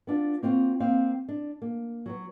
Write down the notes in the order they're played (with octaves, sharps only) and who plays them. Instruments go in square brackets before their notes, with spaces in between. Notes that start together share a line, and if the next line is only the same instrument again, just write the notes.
[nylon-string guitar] B3 D4 F4
A#3 C4 F4 F#4
A#3 C4 F5
D4
A#3
F#3 B3